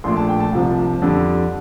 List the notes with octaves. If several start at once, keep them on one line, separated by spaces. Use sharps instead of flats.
A#1 A#2 A3 D4 C6
A5
G5
A5
C2 C3 F3
F2 D3 G3 D4